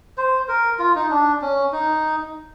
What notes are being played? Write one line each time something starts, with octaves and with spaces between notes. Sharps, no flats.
C5
A#4
F4
D#4
D4
C#4
D#4